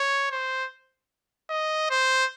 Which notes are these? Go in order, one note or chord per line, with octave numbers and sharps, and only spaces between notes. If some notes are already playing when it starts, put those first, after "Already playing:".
Already playing: C#5
C5
D#5
C5